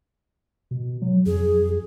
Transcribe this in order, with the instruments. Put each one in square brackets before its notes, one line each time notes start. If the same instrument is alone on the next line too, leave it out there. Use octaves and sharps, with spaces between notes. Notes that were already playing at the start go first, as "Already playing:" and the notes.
[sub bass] B2
F#3
[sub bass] F2 [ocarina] G#4